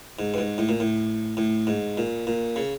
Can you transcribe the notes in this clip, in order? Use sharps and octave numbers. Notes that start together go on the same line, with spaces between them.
G#2
G2
G#2
A2
A#2
A2
A2
G#2
A#2
A#2
C#3